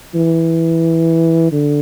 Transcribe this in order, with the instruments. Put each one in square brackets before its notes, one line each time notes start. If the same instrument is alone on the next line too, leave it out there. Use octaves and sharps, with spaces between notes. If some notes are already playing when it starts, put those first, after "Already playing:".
[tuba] E3
D3